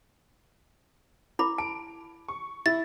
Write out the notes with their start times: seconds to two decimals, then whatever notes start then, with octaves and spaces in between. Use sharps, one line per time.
1.39 E4 B5 D6
1.58 A5 D7
2.28 C#6
2.66 E4 A6